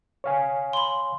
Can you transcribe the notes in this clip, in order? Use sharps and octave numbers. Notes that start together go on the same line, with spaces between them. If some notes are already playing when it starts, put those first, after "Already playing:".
C#5 F5 G#5
B5 C6